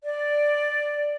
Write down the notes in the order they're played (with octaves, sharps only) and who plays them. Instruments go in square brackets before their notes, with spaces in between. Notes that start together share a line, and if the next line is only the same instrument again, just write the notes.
[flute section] D5